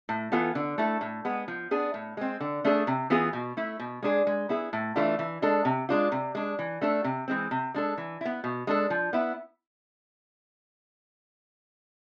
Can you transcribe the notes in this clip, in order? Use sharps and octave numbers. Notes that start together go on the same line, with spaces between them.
A2
E3 B3 F4 A4
D3
A3 E4 A4
A2
G#3 B3
F3
B3 D4 G#4
A2
G#3 C4
D3
A3 D4 G#4
C3
E3 B3 F4 G#4
B2
A3 E4
B2
G#3 D4 G#4
G#3
B3 E4 G#4
A2
E3 A3 D4 F4
E3
G#3 D4 A4
C3
G#3 D4 F4
C3
G#3 D4
E3
A3 D4 A4
C3
E3 G#3 C4
C3
G#3 D4 A4
E3
B3 E4
B2
G#3 D4 A4
F3
B3 E4